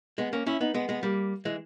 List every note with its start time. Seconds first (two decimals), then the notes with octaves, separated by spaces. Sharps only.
0.18 G#3 B3
0.33 A#3 C#4
0.47 C#4 E4
0.61 B3 D#4
0.74 G#3 B3
0.89 G#3 B3
1.03 G3 A#3
1.45 E3 G#3